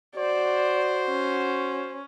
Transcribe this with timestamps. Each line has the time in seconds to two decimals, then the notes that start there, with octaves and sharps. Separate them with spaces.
0.16 F#4 C5 D5
1.10 C#4